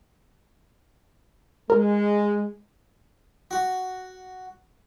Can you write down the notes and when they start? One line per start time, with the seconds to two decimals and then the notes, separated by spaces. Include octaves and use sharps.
1.70 G#3 A#4
3.51 F#4